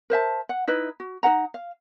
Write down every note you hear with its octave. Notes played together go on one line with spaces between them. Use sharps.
A#4 C5 E5 A5
F#5
D#4 E4 B4 D#5
F#4
D#4 A#4 F#5 A#5
F5